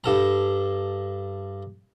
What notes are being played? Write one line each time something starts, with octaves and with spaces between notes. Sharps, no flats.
G2 A4 A#5